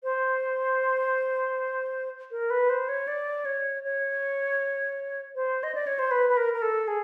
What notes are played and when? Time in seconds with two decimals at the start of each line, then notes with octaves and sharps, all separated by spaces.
0.04 C5
2.31 A#4
2.50 B4
2.70 C5
2.89 C#5
3.08 D5
3.45 C#5
3.84 C#5
5.35 C5
5.63 D#5
5.75 D5
5.87 C#5
5.99 C5
6.11 B4
6.29 B4
6.37 A#4
6.54 A#4
6.62 A4
6.88 G#4